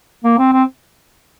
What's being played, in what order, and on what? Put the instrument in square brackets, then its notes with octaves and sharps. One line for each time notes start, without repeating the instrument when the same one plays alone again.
[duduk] A#3
C4
C4